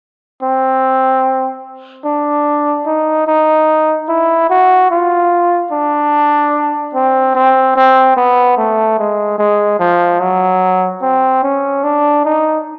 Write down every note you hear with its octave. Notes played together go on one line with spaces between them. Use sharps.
C4
D4
D#4
D#4
E4
F#4
F4
D4
C4
C4
C4
B3
A3
G#3
G#3
F3
F#3
C4
C#4
D4
D#4